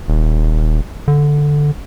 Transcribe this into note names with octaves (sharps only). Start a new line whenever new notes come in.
D#1
D3